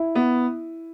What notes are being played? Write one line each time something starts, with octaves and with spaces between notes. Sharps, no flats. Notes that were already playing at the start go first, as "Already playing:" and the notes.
Already playing: E4
B3